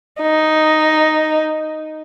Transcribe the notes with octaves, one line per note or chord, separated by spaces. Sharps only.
D#4